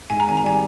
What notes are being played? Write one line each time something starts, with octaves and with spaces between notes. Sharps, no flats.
G#2 G#5
A#5
G#1 G#5
A#5
G3 G#5